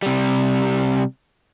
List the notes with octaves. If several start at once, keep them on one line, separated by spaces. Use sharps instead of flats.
C3 G3